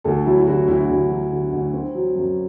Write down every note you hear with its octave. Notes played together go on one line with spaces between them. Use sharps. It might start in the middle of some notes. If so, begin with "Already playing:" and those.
D2 A4
F#3 E4
E4
D3 F#4
D2 E4
D2
F#3
D3
D2
C4
F#3
F#2